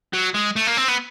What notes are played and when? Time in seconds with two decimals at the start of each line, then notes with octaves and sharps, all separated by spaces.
0.13 F#3
0.34 G#3
0.56 A3
0.67 A#3
0.77 C4
0.88 B3